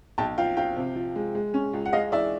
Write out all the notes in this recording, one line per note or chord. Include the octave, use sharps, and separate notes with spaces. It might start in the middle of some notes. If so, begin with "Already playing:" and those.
B1 G5 A5
F3 F5 G5
F3 F5 G5
C3
F3
G#3
G#3
C#4
C#2
F#5
G#3 D#5 F5
E3 D5 E5